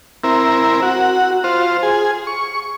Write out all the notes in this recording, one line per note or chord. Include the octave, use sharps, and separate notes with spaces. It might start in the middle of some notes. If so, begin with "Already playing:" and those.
C4 E4 A#4
F#4
F4 C5
G#4
C#6